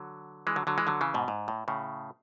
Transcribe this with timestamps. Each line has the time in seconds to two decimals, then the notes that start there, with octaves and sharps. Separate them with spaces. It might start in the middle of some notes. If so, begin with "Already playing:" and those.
Already playing: D3 F#3
0.47 E3 G#3
0.56 D3 F#3
0.67 D3 F#3
0.78 E3 G#3
0.87 D3 F#3
1.01 C#3 E3
1.14 G#2 B2
1.28 G#2
1.48 A2
1.68 A2 C#3